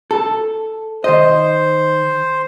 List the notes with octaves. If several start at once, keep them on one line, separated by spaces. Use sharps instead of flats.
A4
D#3 C5 D#5